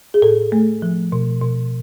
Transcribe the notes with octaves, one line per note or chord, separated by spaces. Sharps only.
G#4
A2 A4
A3
F3
B2
B2